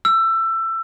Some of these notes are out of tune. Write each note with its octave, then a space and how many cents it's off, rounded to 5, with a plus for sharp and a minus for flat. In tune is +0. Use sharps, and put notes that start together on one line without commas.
E6 +20